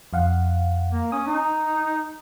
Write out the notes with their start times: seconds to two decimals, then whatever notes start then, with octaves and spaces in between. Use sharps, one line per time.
0.13 F2 F5 F#5
0.92 A#3
1.12 C#4 D#6
1.27 D#4